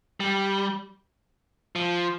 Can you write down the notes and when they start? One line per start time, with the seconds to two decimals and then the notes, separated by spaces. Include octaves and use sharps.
0.20 G3
1.76 F3